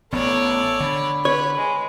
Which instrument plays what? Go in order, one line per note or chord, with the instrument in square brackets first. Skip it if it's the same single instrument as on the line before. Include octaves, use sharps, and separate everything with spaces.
[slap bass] A1 B3 [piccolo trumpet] A4 [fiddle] C#5 D5
[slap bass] D3 [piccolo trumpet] B5
[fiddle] B4 [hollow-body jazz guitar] C#5
[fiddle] G#3